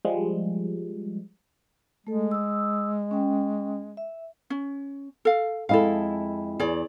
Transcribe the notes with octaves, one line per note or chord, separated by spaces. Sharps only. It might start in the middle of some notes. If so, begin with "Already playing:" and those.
F3 G3 G#3
G#3 A3 A4
D#6 E6
C#4 G5
E5
C#4
A4 F5
F2 G#3 E4 A4 F5
E2 G#4 C#5 D5